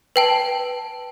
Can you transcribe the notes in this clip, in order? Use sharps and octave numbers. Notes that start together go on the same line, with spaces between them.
B4 G5 A5